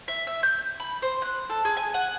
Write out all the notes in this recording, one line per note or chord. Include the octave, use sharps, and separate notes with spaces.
E5
E5
G6
B5
C5
F#6
A4
G#4
G#5
F#5